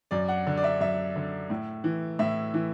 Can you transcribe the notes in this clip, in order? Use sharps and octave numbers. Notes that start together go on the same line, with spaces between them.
F#2 D5
F#5
D3
D5
E5
F#2 E5
D3
A2
E3
A2 E5
E3